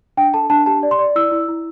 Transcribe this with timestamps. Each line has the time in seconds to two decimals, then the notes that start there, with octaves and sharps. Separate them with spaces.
0.17 D4 G5
0.34 A4 A5
0.50 D4 A5
0.66 G4 A5
0.83 D5
0.91 C6
0.99 D5
1.16 E4 E6
1.32 E4
1.48 E4